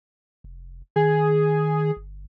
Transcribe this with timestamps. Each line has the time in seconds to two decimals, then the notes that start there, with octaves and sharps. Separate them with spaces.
0.44 F1
0.96 D#3 G#4
1.96 G1